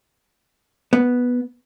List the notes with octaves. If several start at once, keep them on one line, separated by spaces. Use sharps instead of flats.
B3